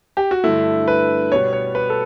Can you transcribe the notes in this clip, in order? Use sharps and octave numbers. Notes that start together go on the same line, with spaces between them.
G4
F#4
G2 D3 A3 E4
B4
B2 G3 B3 C#5
C#5
B4
A4